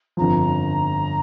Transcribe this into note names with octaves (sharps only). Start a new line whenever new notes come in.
G1 F2 F3 A#5